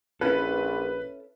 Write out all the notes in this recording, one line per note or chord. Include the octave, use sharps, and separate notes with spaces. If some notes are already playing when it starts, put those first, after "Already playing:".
A#1 C#4 E4 A4 B4